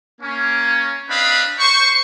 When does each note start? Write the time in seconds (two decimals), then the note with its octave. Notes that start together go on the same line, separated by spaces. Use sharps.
0.21 A#3 C#4
1.10 C4 D4 B4 D#5 F5 B5
1.60 C5 C#6